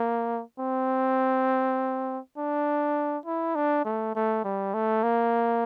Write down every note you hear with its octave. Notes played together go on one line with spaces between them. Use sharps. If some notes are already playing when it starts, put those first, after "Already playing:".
Already playing: A#3
C4
D4
E4
D4
A3
A3
G3
A3
A#3